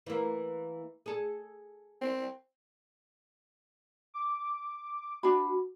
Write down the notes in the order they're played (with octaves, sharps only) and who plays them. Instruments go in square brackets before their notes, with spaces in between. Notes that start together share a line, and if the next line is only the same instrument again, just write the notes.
[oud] E3 A#3
G#4 A4
[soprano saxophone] C4
[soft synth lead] D6
[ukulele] D4 B5 [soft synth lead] F#4